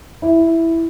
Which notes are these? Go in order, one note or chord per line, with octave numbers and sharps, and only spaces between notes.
E4